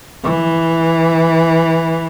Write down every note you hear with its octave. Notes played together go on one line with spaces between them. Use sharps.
E3